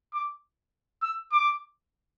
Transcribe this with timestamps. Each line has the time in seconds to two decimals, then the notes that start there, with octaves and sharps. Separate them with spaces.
0.13 D6
1.02 E6
1.32 D6